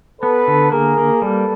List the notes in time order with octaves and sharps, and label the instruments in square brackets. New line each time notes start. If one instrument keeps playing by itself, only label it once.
[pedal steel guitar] B3 [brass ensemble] A4 B4
[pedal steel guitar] D3
[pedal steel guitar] A#3 [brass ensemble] G#4 A#4
[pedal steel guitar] A#3
[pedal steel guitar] G3 [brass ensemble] A4 B4